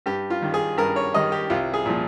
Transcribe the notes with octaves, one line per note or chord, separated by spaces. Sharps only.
G2 G4
F4
D#3 G3
G#4
G2 A#4
C#5
D#3 G3 D#5
G4
C2 F4
G#4
A#2 F3